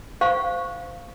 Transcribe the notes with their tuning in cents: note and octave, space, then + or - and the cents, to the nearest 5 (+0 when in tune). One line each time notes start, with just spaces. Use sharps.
C5 -25 F5 +0 C#6 +0